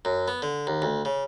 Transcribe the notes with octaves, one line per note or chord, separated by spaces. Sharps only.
F#2
B3
D3
D#2
D2
C#3